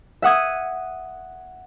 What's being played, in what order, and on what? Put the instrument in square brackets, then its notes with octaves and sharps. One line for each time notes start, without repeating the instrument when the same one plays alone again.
[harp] E5 F#5 D#6 G#6